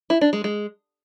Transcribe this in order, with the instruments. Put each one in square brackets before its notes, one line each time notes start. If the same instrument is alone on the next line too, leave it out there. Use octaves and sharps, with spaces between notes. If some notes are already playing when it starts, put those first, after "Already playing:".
[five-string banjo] E4
D4
G#3
G#3